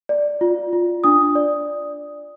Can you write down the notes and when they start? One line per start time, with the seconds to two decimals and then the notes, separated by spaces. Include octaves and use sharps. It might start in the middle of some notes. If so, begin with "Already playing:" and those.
0.09 D5
0.41 F4
0.73 F4
1.04 D4 D#6
1.35 D5